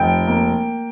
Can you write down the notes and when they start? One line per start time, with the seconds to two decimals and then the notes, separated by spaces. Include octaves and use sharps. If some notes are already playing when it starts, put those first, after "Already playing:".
Already playing: F1 G5
0.27 A#3